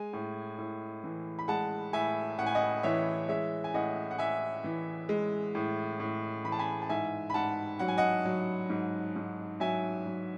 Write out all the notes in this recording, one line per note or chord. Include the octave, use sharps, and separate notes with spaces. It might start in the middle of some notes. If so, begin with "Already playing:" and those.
Already playing: G#3 G#5
A2
A2
E3
B5
G#3 F#5 A5
A2 E5 G#5
A2 F#5
G#5
D#5 F#5
E3 C#5 E5
G#3 C#5 E5
G#5
A2 D#5 F#5
F#5
A2 E5 G#5
E3
G#3
A2
A2
E3 B5
A5
G#5 B5
A5
G#2 E5 G#5
B5
G#2 F#5 A5
F#3 F#5
G#5
D#5 F#5
F#3
G#2
G#2
F#3 E5 G#5
F#3